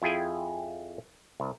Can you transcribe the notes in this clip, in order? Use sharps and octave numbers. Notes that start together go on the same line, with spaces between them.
F2 E4 F4 G#4 G5 G#5
C2